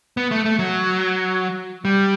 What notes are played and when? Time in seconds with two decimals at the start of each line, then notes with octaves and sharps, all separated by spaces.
0.17 B3
0.31 A3
0.45 A3
0.59 F#3
1.85 G3